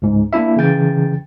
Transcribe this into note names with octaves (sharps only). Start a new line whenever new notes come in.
C#2 G#2
A#3 D4 E4 E5
C#3 E3 G5 A6